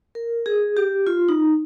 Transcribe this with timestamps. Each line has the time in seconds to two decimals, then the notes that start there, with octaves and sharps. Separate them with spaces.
0.15 A#4
0.46 G#4
0.77 G4
1.07 F4
1.29 D#4